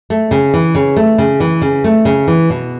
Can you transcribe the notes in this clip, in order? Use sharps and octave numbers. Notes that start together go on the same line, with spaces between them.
A3
C#3
E3
C#3
A3
C#3
E3
C#3
A3
C#3
E3
B2